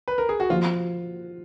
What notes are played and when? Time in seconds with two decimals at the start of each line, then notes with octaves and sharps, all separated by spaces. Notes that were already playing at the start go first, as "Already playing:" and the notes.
0.08 B4
0.18 A#4
0.29 G#4
0.40 F#4
0.50 F3 F4